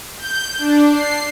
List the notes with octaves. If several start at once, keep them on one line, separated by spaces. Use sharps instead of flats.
G6
D4
C7